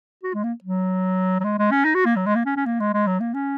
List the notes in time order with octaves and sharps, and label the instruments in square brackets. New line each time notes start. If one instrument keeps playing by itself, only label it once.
[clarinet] F#4
G#3
A#3
F#3
F#3
G#3
G#3
C#4
D#4
F#4
A#3
F#3
G#3
A#3
C#4
C#4
A#3
G#3
G#3
F#3
A#3
C#4